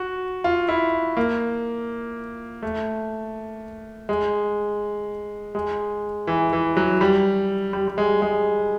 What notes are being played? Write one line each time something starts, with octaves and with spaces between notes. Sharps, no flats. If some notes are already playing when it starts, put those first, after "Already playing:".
Already playing: F#4
F4
E4
A#3
A3
G#3
G#3
E3
E3
F#3
G3
G3
G3
G#3
G#3